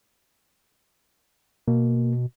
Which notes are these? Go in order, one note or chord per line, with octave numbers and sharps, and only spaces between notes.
B2 A#3